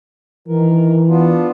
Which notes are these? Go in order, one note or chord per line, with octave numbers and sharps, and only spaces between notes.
D#3 E3 A#4
B3 D4 F4